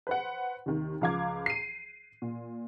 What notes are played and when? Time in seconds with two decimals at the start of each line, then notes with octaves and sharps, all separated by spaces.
0.07 B4 C5 F#5
0.66 D#2 C3 D#3
1.01 C#2 F3 F5 D6 G#6
1.46 C7 D#7
2.22 A#2